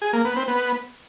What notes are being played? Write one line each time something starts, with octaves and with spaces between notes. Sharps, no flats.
G#4
A#3
B3
C4
B3